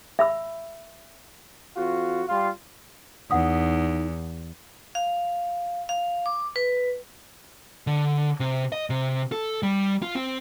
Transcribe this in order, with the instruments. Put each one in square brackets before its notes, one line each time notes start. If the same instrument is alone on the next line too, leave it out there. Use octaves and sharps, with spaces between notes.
[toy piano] E5 B5 E6
[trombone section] F2 F4 F#4
G3 F4
[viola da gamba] E2 [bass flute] D#4 [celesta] F#5 D#6
[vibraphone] F5
F5
D6
B4
[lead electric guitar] D3
C3
D#5
C3
A4
G3
F4
C4